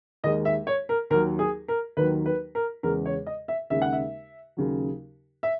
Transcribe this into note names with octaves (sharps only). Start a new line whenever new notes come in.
D#2 D#3 G#3 D#5
E5
C#5
A#4
D#2 D#3 F#3 A#4
G#4
A#4
D#2 D#3 F#3 B4
B4
A#4
E2 C#3 G#3 A#4
C#5
D#5
E5
D#2 C#3 G#3 E5
F#5
E5
D#2 C#3 F#3
E5